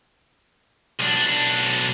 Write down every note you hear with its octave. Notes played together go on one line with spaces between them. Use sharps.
B1 D4